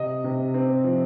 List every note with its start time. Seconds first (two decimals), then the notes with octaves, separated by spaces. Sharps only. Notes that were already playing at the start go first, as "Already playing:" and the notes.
Already playing: C3 D#5
0.24 C3
0.54 C4
0.84 F3